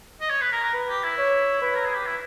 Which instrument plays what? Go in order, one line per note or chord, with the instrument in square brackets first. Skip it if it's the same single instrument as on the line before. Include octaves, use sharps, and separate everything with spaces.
[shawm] D#5
C#5
B4
A#4
A#4
[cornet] B4
[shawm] G4
E4
[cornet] C#5
B4
[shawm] A#4
G#4
G4
E4